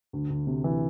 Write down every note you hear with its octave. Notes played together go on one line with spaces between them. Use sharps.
D2
D2
C3
E3